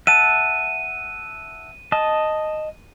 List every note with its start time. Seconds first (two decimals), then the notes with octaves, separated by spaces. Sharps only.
0.07 E5 F#5 A5 D#7
1.92 D#5 A5